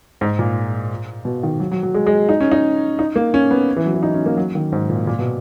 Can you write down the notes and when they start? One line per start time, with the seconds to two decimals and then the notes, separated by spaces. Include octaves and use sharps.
0.21 G#2
0.39 A#2
1.25 B2
1.43 D#3
1.60 F#3
1.71 F#3
1.83 F#3
1.94 G#3
2.07 G#3
2.29 D#4
2.40 C#4
2.52 D#4
2.99 D#4
3.16 A#3
3.34 C#4
3.51 B3
3.76 E3
3.86 F#3
3.94 E3
4.03 D#4
4.14 C#4
4.26 A#3
4.37 F#3
4.55 D#3
4.72 G#2
4.90 A#2
5.07 A#2
5.19 B2